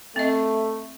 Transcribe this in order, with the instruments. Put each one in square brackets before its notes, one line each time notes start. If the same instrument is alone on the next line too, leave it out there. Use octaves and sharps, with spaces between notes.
[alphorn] A3 [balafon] C4 D#5